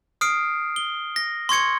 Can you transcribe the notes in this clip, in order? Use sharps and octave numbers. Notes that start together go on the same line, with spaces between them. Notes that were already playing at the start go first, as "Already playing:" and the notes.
D#6 F6 C7 D7
G7
A#6
C6 C#6 G#6 C#7